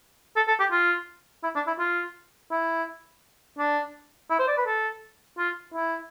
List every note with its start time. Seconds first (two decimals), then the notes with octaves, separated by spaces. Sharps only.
0.36 A4
0.48 A4
0.60 G4
0.72 F4
1.43 E4
1.55 D4
1.67 E4
1.79 F4
2.51 E4
3.58 D4
4.30 E4
4.39 C5
4.48 D5
4.57 B4
4.66 A4
5.38 F4
5.74 E4